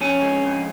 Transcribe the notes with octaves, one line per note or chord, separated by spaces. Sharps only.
F2 C#4
G#3
F2